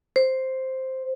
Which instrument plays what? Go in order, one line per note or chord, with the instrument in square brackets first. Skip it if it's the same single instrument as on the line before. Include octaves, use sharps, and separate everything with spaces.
[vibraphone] C5